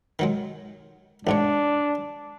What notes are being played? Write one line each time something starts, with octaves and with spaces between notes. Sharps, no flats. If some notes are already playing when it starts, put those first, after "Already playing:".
D#3 F#3 G#3
A1 G#2 D4 C#5